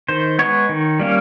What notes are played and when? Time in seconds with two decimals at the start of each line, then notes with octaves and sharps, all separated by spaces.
0.08 D#3 C5
0.39 G#3 B3 C#5
0.69 D#3
1.00 G3 A#3 C#4